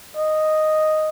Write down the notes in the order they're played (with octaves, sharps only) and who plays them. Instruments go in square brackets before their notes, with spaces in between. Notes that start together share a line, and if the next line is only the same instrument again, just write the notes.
[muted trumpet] D#5